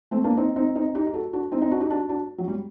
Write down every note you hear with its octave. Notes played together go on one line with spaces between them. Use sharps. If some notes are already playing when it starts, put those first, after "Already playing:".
A3 C4
A#3 D4
C4 D#4
C4 D#4
C4 D#4
D#4 G4
G4
F#4 A4
D4 F#4
C4 D#4
C4 D#4
D4 F#4
D#4 G4
D4 F#4
D4 F#4
F#3
G3